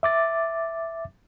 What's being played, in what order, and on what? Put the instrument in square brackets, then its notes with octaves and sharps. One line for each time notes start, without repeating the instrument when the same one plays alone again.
[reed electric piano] E5 D6 A6